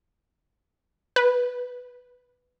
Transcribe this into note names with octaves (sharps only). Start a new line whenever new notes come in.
B4